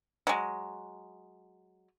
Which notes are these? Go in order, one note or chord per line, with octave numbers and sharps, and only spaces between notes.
F#3 G#3